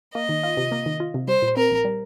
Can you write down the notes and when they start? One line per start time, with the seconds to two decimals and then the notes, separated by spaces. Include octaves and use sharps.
0.15 A#3 D#5
0.29 D#3
0.43 F4
0.57 C3
0.72 A#3
0.86 D#3
1.00 F4
1.14 C3
1.28 G3 C5
1.42 A#2
1.57 C4 A#4
1.71 A#1
1.85 G3